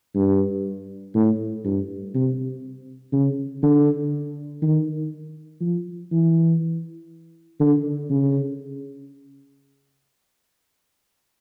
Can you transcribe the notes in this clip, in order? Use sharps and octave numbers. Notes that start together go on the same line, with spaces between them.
G2
A2
G2
C3
C#3
D3
D#3
F3
E3
D3
C#3